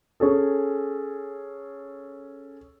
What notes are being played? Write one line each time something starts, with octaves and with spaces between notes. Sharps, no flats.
C#4 G#4 A4